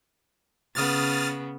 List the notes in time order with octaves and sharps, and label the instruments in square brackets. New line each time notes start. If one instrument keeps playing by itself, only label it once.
[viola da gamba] C#3 B3 [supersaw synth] D#6 F6 A6